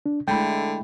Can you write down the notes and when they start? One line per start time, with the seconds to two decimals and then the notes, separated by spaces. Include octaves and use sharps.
0.06 D4
0.28 D3 G#3 A3 E4 G5 B5